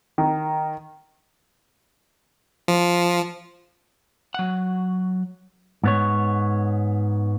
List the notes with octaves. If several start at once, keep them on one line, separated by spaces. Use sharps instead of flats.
D#3
F3
F#3 F#5
G#2 B3 C#5